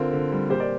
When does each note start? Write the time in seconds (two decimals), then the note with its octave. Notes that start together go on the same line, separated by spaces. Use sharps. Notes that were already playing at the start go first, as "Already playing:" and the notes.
Already playing: D3 C4 F4 A#4
0.13 D3
0.32 G3
0.50 A#2 G4 C5
0.60 A#4 D5